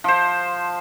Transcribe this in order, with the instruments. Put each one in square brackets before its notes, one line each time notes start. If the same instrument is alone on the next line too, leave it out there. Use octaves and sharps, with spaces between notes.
[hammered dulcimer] F3 C5